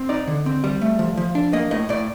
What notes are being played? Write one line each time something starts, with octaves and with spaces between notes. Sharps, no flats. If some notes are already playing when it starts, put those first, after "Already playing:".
Already playing: C4
D#4 D5
D3
C4
G3
A3
F3
F3
D4
A#3 D#5
A2 D#5
A2 D5